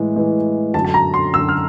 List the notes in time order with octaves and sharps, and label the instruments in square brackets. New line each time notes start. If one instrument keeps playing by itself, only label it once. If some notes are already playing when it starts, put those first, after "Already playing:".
Already playing: [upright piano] A2 E3 G#3
A2 E3 G#3
[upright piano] F#2 D3 F#3 [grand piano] A5
[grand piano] A5
A#5
C6
[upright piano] F#2 D3 F#3 [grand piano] E6
[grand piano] F6